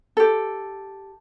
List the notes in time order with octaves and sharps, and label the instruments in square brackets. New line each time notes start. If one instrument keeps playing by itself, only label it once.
[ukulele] G4 A4